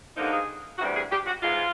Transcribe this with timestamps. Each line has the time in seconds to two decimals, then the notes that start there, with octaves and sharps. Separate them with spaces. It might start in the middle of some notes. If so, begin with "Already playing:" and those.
0.16 G2 D3 F3 A#3 D#4
0.31 G#4
0.78 D2 C3 E3 G3 F#4
0.95 G#4
1.11 G4
1.26 F#4
1.42 G#2 E3 G#3 F4